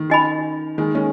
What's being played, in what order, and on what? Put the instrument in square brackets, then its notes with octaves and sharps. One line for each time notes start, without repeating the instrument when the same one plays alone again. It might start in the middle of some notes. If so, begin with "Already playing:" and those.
Already playing: [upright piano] D#3
[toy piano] C#4 F#4 D#5 G#5 B5
[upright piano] D#3 G#3
G#3 C#4